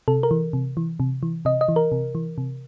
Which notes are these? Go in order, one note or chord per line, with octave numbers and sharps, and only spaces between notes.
C3 A4
A#4
E3
C3
E3
C3
E3
C3 D#5
D#5
E3
A#4
C3
E3
C3